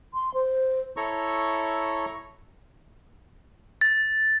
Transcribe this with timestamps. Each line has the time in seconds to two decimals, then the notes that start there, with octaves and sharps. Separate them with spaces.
0.14 C6
0.34 C5
0.97 E4 A4 C#5 A#5 C#6
3.81 A6